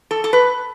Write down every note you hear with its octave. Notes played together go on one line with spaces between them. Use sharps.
A4
A4
B4